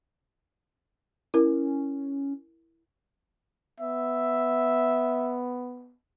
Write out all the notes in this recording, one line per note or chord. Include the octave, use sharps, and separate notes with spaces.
C#4 E4 A#4
B3 E5